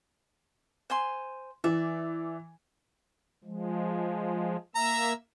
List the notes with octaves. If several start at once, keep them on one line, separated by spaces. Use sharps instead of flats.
C5 G#5 C6
E3 D5 E5
F3 G#3
A#3 E5 A#5 E6